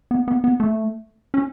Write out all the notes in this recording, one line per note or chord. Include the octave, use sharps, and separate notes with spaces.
B3
B3
B3
A3
C#4